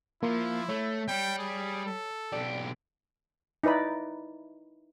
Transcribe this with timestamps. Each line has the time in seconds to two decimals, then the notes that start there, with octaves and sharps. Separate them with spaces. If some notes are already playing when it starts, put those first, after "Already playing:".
0.23 F3 A#3 E4
0.69 A3 C#5
1.08 G3 G5
1.39 G#4
1.86 A4
2.32 B1 G4 D5
3.64 D#4 E4 B4 D5 B5